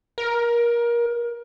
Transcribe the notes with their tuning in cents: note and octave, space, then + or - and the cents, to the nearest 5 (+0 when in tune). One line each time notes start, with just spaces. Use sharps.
A#4 +25